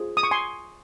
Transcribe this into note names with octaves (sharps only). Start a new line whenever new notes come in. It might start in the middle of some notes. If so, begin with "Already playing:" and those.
Already playing: F4 G#4 C5
D#6
C#6
G#5 C6